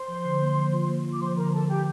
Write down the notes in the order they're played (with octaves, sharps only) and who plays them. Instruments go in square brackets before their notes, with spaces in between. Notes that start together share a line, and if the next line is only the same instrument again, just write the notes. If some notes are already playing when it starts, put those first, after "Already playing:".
Already playing: [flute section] C5 C6
[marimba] F3
D3
A#3
F3
F4
A#3
F4
[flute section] D6
[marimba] F3 [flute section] C5 C6
[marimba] D3 [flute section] A#4 A#5
[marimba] F3 [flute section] A4 A5
[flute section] G4 G5